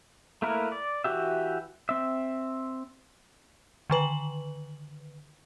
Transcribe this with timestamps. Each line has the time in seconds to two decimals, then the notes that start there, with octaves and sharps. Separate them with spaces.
0.42 A3 A#3 E4 A#4 B4
0.72 D5
1.04 E3 F#4 G4 E5
1.89 C4 E5
3.90 D3 D#3 B4 F#7